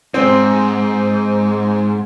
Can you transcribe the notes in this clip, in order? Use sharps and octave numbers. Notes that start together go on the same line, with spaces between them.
E2 G#2 C4